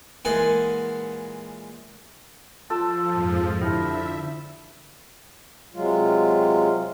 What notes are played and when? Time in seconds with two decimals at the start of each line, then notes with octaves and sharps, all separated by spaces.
0.25 A#2 E3 G#3 A4 F#5 G#5
2.70 F3 F4 A4 A5
3.15 F2 G#2
3.62 D3 E4 G4 E5
5.74 C3 F#3 G#3 F4